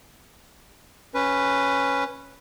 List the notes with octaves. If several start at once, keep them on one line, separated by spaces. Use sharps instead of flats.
C#4 B4